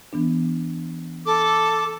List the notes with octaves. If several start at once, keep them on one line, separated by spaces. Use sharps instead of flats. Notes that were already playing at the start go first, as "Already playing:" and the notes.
E3 B3 D4
A4 D6